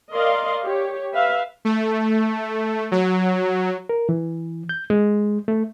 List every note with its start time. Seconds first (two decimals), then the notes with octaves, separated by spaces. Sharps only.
0.11 A#4 D5 D#5 F5 C6
0.64 G4 C#5
1.14 B4 E5 F5
1.65 A3
2.92 F#3
3.89 A#4
4.09 E3
4.69 G6
4.90 G#3
5.48 A3